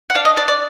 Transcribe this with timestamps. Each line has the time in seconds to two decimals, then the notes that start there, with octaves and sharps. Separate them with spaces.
0.10 F#5
0.15 D4 F5
0.25 D#5
0.36 D4 D5
0.48 D5